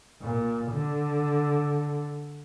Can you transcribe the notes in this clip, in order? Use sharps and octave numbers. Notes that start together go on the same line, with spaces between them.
A#2
D3